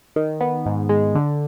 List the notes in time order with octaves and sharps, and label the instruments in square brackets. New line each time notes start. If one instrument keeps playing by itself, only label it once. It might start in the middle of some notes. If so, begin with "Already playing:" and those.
[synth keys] D#3
B3
G#2
G#3
D3